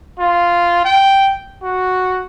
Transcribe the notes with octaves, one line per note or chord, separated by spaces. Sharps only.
F4
G5
F#4